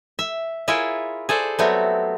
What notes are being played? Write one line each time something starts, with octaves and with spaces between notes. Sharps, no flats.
E5
E4 F4 G#4 A#4 C#5 E5
G#4 A4 C5 D5
F#3 G3 A3 B3 C4